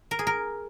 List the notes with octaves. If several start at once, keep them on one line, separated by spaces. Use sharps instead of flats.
A#4
G#4
A#4